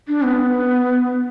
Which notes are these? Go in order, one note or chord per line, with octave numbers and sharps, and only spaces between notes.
D4
B3